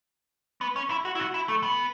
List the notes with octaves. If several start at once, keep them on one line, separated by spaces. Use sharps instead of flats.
B3
C#4
E4
F#4
E4
F#4
E4
A3
B3